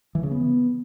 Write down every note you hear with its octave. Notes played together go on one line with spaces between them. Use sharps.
E3
C#3
B3